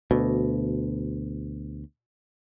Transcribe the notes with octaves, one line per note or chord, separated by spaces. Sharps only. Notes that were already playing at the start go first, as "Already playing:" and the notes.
D2 B2